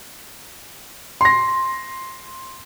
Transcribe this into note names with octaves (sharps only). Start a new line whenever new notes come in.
C6 A#6